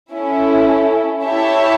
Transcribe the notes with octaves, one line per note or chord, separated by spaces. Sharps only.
C#4 E4 A4
E4 G4 C#5 E5 A5